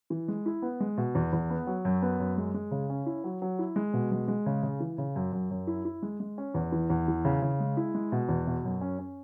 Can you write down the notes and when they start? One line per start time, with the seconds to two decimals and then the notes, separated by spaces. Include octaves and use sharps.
0.10 E3
0.28 G#3
0.46 E4
0.62 B3
0.80 G#3
0.97 B2
1.15 E2
1.33 E2
1.50 B3
1.67 F#3
1.85 F#2
2.02 B3
2.19 F#2
2.38 G#3
2.54 G#3
2.71 C#3
2.90 C#4
3.06 E4
3.24 F#3
3.42 F#3
3.59 E4
3.76 G#3
3.93 B2
4.12 G#3
4.28 G#3
4.46 C#3
4.63 C#3
4.80 E3
4.98 C#3
5.16 F#2
5.33 F#2
5.51 F#2
5.67 E4
5.85 E4
6.02 G#3
6.20 G#3
6.38 C#4
6.54 E2
6.72 E3
6.90 E2
7.08 E3
7.25 C#3
7.42 C#3
7.60 G#3
7.77 E4
7.94 G#3
8.12 B2
8.29 E2
8.47 B2
8.65 F#2
8.81 C#4
8.99 C#4